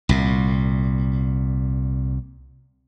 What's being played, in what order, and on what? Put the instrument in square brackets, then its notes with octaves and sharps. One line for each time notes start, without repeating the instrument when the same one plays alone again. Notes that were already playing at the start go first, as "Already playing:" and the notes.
[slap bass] C2 A#2